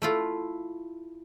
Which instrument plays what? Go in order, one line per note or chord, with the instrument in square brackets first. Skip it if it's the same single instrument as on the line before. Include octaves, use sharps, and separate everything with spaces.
[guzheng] A3 E4 F4